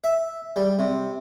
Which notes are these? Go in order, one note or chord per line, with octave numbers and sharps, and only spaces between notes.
E5
G3
C3